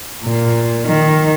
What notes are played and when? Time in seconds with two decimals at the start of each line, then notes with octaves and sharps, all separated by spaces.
0.23 A#2
0.85 D#3